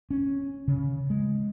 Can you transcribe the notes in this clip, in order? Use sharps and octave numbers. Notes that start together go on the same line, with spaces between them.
C#4
C#3
G#3